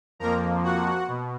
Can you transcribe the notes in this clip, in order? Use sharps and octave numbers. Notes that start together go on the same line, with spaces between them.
F2 F3 A#3 A#4 A#5
F#4 F#5
B2